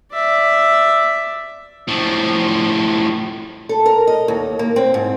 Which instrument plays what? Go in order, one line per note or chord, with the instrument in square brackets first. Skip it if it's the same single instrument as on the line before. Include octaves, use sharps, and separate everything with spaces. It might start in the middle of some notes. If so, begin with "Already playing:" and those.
[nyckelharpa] D5 E5
[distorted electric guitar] A2 F3
[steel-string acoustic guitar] A4
A#4
D#5
D#2
A#3
C4
G#2